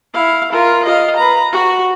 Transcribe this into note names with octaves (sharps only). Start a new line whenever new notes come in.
E4 F5
F4 A#4
D#5 F5
B4 A#5
F#4